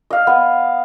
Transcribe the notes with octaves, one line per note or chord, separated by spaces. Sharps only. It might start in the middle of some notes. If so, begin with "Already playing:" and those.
D#5 F5
B3